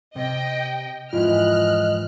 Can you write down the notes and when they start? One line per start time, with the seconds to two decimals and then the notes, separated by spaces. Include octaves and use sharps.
0.16 C3 D#5 G5
1.13 F2 G#2 E3 F4 D#5 F6 F#6